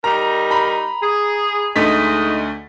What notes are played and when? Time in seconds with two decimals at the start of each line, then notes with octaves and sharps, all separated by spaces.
0.04 G3 D#4 A#4 A#5
0.51 A#5 B5
1.02 G#4
1.76 D2 G#3 A3 D#4 B6